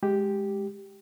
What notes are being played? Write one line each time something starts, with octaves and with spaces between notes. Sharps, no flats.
G#3 G4